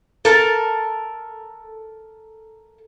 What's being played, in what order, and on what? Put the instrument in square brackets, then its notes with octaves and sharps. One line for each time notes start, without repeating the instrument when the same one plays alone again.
[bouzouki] A4 A#4 A5